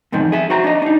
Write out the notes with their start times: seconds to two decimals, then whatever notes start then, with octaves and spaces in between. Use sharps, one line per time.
0.12 E2 G#2 C3 D#3 F3
0.32 G#4 E5
0.50 F#4 C5 A#5
0.64 D4 D#5
0.82 D4 D#4